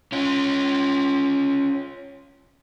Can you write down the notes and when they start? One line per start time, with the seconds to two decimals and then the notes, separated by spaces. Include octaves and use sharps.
0.12 C#4 F4